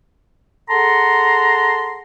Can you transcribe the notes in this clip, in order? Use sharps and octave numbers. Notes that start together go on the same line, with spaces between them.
G#4 A4 F#5 A5 A#5 C6